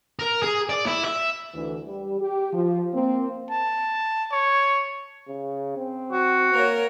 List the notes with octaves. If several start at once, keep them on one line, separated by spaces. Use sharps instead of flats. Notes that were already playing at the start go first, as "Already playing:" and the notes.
A#4
G#4
D5
E4
E5
D2 D3 E3
G3
G4
F3
A#3 C4
A5
C#5
C#3
C4
F#4
A#3 A#4 C#5